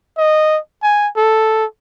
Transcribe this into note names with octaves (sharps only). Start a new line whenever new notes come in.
D#5
G#5
A4